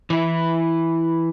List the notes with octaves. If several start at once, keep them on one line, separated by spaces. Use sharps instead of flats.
E3 E4